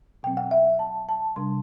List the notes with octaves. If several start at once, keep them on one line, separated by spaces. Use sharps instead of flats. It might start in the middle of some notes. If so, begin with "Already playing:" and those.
B2 F#3 C4 G5
F#5
E5
A5
A5
C3 G3 D4 C6